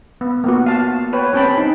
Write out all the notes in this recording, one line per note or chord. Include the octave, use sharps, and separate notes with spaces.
B3
A#3 B3 F#4
F5 A5
B4 C#5 G5
C4 C#4 G5 A5 B5
D#4